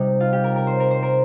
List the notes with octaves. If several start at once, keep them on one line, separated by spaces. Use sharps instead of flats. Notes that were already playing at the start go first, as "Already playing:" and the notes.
Already playing: C3 G3 D#4
F4
G4
A#4
A#4
C5
A#4
C5
A#4